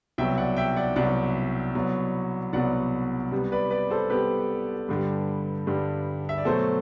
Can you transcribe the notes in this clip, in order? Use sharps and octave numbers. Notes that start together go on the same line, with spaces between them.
C2 B2 F#3 E5 G5
D5 F#5
E5 G5
D5 F#5
C2 B2 F#3 D5 F#5
C2 B2 F#3 B3
C2 B2 F#3 B3 D5 F#5
C3 G3 B3
B4 D5
B4 D5
A4 C5
C3 G3 B3 G4 B4
G2 D3 G3
G2 D3 G3
E5
D5
B2 F#3 A3 A4 C5